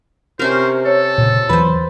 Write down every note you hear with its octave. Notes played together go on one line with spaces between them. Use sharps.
C3 C#4 A#4 C5
A4 C#5
A#2 C#3
E2 E3 F#3 B4 C5 B5